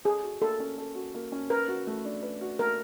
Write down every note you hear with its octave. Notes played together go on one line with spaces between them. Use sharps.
G#4 A4
F#4
A#3 A4
C#4
A4
F#4
A#3
C#4
A#4 B4
F#4
A3
D4
B4
F#4
A3 A#4